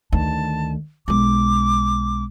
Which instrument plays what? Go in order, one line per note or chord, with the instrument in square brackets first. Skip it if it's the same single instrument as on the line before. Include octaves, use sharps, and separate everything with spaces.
[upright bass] D2 D#3 [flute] A5
[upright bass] B1 G#3 [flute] D6